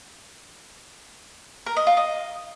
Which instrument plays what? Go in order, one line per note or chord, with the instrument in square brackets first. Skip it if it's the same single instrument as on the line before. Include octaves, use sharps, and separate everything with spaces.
[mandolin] A#4
D#5
F4
D#5